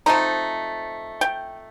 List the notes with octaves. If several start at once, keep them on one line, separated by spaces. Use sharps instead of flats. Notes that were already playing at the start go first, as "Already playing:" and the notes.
F3 A3 C4 D#4 A#5
G5